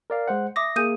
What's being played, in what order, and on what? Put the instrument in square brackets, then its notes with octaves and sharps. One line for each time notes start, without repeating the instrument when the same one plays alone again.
[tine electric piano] A#4 D5 F5
G#3 C5 F#5
[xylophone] E5 D6 D#6 [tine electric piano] A#6
[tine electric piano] A#3 G#4 [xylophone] D#6 G6 D#7